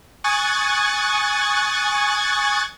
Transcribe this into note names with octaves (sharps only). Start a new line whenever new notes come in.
G#5 C#6 D#6 F#6 G#6 A6